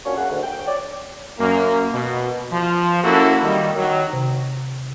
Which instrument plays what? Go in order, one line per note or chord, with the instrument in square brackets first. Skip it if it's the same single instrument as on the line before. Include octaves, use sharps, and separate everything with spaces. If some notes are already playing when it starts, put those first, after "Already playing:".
[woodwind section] A#3 C#4 D4 F4 F#4 C#5
F#2 A#3 G#4 A#4 F#5
D2
G5
C#5 D5
[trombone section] F#2 A#3
B2
F3
A#3 C#4 E4 F#4 A4
D#3 G3
D#3 F#3
[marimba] C3